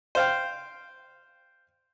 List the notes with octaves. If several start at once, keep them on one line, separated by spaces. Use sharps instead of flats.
C5 F5 G5